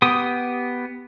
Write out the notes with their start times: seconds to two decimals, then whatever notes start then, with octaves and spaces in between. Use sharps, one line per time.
0.02 B3 G4 D#6